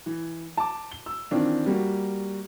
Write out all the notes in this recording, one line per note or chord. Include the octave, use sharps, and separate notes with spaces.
E3
A5 D6
G7
E6
D#3 E3 C4 D4 F4
G3 A#3 F#4